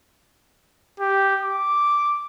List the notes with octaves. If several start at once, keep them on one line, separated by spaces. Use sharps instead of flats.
G4
D6